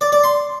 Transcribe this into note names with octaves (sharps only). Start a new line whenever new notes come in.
D5
D5
C6